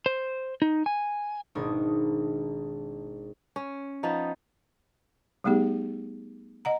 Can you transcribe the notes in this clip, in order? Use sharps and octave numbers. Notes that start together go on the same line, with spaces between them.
C5
D#4
G#5
G#1 B2 D#3 D4 C#6 D#6
C#4
F3 B3 D#4
G3 A3 B3 D#4 G4 G#4
D#5 F#5 A#5